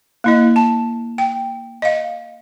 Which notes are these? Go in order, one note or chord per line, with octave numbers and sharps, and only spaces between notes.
A#3 E4 D#5
A5
G5
D#5 F5